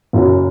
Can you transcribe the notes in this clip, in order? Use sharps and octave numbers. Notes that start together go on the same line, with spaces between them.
F#1 F#2 F#3